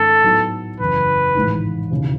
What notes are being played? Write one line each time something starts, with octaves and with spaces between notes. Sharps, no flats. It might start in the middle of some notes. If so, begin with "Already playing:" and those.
Already playing: G#2 D#3 G#3 C#4 A4
A2 F#3 B3 D#4
F#1 E2 C#3 B4
A1 G#2 D#3 G#3 D#4
E1 D#2 C#3